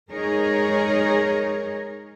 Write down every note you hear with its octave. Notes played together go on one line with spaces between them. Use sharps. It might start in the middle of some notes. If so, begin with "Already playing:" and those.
G#3 D#4 G#4 A#4 C#5